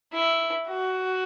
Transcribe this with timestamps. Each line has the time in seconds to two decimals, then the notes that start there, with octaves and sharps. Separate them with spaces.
0.13 E4
0.68 F#4